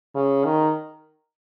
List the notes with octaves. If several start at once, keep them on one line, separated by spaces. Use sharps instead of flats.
C#3
D#3